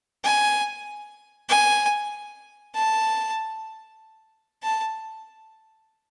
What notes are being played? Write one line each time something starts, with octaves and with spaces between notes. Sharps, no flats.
G#5
G#5
A5
A5